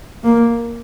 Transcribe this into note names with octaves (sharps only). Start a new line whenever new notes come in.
A#3